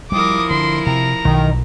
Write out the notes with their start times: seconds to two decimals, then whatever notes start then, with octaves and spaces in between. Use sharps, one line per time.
0.12 F3 G3 E4 A#4 D6 D#6
0.51 D3 C6
0.87 C3 A#5
1.25 B1 D#3